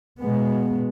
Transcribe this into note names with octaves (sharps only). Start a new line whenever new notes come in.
B2 G#3 B3